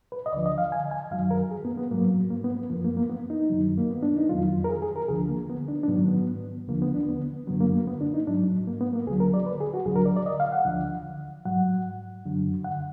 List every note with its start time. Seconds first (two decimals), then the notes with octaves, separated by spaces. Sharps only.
0.12 B4
0.26 D#5
0.32 D2 D3 F3 D5
0.46 D#5
0.58 F5
0.72 G#5
0.91 G#5
1.11 F#2 D#3 F#3 F5
1.31 A#4
1.51 G#4
1.65 B3
1.77 B3
1.91 G#2 F#3 A#3
2.30 A#3
2.44 B3
2.57 B3
2.70 F#2 F3 A#3
2.84 A#3
2.97 A#3
3.10 B3
3.30 D#4
3.50 F#2 D#3 F#3
3.77 A#3
3.91 B3
4.03 D4
4.17 D#4
4.29 F2 D#3 F#3 F4
4.64 A#4
4.69 G#4
4.82 G#4
4.96 A#4
5.08 D2 D3 F3 G#4
5.30 A#3
5.49 B3
5.68 D4
5.83 D4
5.88 G#2 D#3 F#3 B3
6.08 B3
6.68 D#2 D3 F3 A#3
6.82 B3
6.94 D4
7.08 B3
7.47 F#2 D3 F#3 B3
7.60 A#3
7.74 A#3
7.88 B3
8.01 D4
8.14 D#4
8.27 G#2 F#3 D4
8.67 A#3
8.80 B3
8.93 A#3
9.06 D2 D3 F#3 G#4
9.20 A#4
9.34 D5
9.46 B4
9.60 G#4
9.74 F#4
9.86 D2 D3 F#3 G#4
9.96 A#4
10.06 D5
10.16 D5
10.26 D#5
10.40 F5
10.52 F#5
10.65 D2 D3 F3
11.45 G#2 F#3 F#5
12.25 F#2 D3 F#3
12.64 F#5